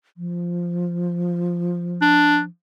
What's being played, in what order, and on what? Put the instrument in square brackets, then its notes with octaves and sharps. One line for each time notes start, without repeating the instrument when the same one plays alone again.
[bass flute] F3
[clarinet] D4